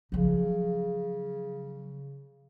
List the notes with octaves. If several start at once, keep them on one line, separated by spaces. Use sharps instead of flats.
C#3 F3 F#3